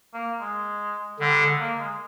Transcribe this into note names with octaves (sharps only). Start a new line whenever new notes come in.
A#3
G#3
D3 G3
G#3
A#3
G#3